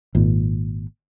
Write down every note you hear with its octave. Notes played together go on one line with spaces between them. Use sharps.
G#1 A#2